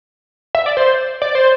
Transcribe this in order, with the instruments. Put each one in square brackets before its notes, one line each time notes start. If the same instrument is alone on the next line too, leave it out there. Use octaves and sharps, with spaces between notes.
[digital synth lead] E5
D5
C5
D5
C5